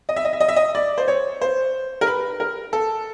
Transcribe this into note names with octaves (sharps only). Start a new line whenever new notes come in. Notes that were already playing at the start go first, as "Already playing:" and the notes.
D#5
E5
D#5
E5
D#5
E5
D#5
D5
C5
C#5
C5
A#4
B4
A#4
A4